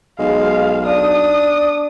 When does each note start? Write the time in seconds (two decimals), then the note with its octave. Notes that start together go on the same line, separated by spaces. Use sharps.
0.19 B1 G#3 F5
0.86 D4 D#6